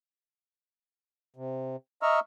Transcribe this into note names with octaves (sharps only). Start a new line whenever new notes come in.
C3
D#5 E5 A#5 C#6 E6 F6